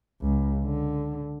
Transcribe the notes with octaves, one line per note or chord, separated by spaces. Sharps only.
C#2
D3